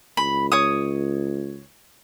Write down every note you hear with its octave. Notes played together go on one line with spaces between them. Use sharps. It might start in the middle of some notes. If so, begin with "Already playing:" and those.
C#2 B5
C#5 D#6